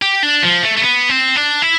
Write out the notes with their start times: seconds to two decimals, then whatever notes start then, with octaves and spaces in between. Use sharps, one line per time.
0.02 G4
0.23 D4
0.43 F3
0.63 A3
0.77 A3
0.82 B3
1.09 C4
1.36 D4
1.62 E4